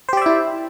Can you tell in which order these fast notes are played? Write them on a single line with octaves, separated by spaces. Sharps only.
C5 G4 D5 E5 E4